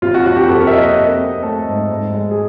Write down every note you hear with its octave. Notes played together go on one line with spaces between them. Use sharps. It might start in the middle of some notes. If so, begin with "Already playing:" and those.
C3 F4
F#4
F2 F#4
G4
C3 A4
A#4
E5
A#3 D#5
D#5
C4
C4
A3 A4
G#2
G#2
G#3
G#4